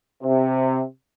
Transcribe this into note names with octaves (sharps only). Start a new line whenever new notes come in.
C3